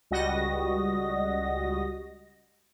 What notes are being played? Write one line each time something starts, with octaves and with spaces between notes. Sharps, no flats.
C#2 G3 F#4 D#5 A#6